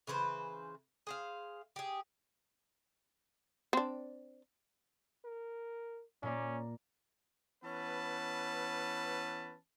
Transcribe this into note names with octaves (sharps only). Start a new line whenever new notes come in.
C#3 E3 B4 C5
G#4 C5 F5
G4 G#4
C4 D4
A#4
A#2 A#3 C#4 D5
E3 B3 C#4 B4 A5